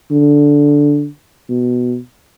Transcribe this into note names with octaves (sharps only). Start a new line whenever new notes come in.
D3
B2